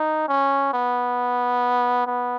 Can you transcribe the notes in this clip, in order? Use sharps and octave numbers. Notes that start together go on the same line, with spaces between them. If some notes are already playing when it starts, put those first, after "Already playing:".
Already playing: D#4
C#4
B3
B3